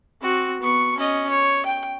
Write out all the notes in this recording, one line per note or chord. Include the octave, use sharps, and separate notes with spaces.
C4 F#4
B3 C#6
C#4 D#5
C#5
G5